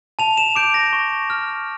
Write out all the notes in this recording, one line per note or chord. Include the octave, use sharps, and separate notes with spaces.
A5 F7
E7
D6 G6 D7
A#6
C#6
F6